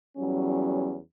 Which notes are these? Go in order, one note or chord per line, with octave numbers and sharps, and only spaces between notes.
E2 F#3 G3 C#4